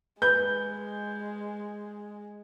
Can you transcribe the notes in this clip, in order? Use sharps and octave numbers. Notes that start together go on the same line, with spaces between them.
G#3 B4 G6